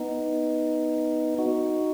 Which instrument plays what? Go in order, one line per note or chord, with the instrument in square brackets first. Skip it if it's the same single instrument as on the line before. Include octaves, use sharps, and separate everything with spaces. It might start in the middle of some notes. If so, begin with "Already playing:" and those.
Already playing: [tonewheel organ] B3 D#4
D#4 F#4